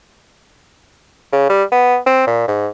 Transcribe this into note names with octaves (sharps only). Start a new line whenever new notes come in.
C#3
G3
B3
C4
A#2
G#2